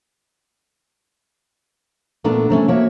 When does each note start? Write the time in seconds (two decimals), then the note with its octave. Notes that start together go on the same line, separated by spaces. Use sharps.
2.24 A#2 A3 B3 D4 A#5
2.50 C3 A3 C#4
2.68 A#3 F#4 C#5 E5